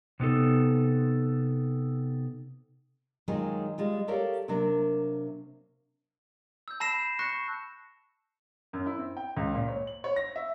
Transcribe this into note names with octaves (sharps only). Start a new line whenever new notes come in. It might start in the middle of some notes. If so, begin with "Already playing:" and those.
C3 B3 D#4 A4
D#3 F#3 G#3 D#4 F4 G#4
G3 G#3 F4
G4 A4 A#4 C#5 D5 F5
C3 F#3 A#3 D4 A#4
E6 G6
A5 B5 E6 A#6 C7 E7
C#6 F#6 A#6 C#7
F#2
E4
C4
G5
C#2
A#2
C#5
F#7
C#5
A#6
E5